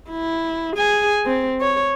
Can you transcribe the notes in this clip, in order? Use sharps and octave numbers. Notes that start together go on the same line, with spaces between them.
E4
G#4 G#5
C4
C#5